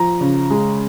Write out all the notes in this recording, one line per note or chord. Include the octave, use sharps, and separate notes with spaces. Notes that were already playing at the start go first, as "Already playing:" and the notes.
Already playing: F3 A#5
C#3
G#3